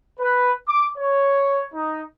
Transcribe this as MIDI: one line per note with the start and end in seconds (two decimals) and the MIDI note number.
0.20 0.53 71
0.68 0.86 86
0.98 1.65 73
1.74 2.01 63